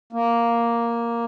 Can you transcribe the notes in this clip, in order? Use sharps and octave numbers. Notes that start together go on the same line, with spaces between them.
A#3